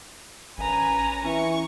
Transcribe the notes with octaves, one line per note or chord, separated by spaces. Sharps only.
A1 C#4 B4 G#5 A#5
E3 C#4 C#6